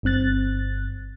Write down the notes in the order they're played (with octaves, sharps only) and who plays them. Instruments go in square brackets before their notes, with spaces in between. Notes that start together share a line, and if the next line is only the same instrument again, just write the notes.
[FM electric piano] G1 G2 C4 F#6 A6